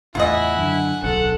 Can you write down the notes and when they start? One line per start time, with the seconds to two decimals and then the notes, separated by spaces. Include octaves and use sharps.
0.15 E2 A2 C#3 E4 F4 D#5 F#5 G#5
0.57 F#2 D3
1.03 D1 B1 C#3 A4 F#5